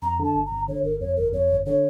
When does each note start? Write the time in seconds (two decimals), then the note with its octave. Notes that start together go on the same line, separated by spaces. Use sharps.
0.02 F2 A#5
0.19 D3 A5
0.35 G1
0.46 A#5
0.52 G1
0.68 D3 C#5
0.84 G1 A#4
1.00 F2 C#5
1.16 G1 A#4
1.33 F2 C#5
1.50 G1
1.66 D3 C#5